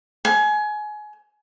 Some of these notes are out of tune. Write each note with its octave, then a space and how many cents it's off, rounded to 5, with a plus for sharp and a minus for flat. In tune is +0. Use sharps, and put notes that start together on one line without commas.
G#5 +25